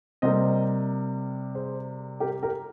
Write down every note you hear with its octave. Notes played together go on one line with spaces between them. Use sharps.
C3 G3 A#3 C5 D#5
G#4 C5
G4 A#4
G4 A#4